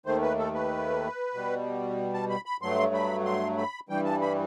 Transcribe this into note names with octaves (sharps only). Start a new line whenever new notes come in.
D#2 D#3 A3 C5
B4
A4
B4
B2 G3
A5
B5
B5
G2 F#3 A3 C6
B5
C6
B5
G2 E3 G3 G5
A5
B5